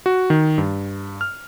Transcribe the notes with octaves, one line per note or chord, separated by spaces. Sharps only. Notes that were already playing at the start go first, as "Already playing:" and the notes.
F#4
D#3
G2
F6